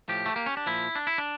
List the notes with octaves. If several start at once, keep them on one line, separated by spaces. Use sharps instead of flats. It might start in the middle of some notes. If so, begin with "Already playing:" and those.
A2 F3 G4
A3
A#3
C#4
D4
A#2 F3 E4
D4
E4
D4